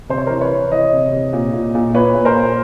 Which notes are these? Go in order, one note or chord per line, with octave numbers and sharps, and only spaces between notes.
C3 C5
C#5
E3 A#4 C5
B4 C#5
C3
E3 C#5 D#5
C3
C3
A#2
A#2
A#2
A#2 B4 C#5
A#2
A#4 C5
A#2